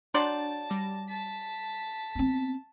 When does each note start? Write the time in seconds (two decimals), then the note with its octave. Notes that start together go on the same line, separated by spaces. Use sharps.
0.14 F#3 D4 D5 A5 C6 G6 A6
0.69 G3 D6 A#6
1.08 A5 B6
2.15 B3 C4